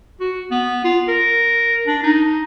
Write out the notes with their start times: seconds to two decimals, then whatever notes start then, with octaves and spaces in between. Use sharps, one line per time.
0.20 F#4
0.51 B3
0.84 F4
1.08 A#4
1.87 D4
2.03 D#4